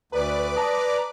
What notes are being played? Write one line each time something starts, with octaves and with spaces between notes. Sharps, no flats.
D2 A4 B4 D5 A#5 D6
A5 A#5 D#6